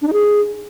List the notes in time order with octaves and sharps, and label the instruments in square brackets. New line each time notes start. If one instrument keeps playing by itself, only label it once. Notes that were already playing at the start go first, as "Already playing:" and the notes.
[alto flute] D4
D#4
G#4